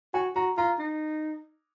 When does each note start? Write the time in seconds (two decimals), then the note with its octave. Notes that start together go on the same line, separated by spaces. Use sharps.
0.14 F#4 G#5
0.35 F#4 A#5
0.57 F4 A#5
0.79 D#4